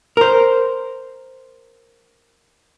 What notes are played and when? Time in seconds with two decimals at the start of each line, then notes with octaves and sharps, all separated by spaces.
0.17 A#4 C5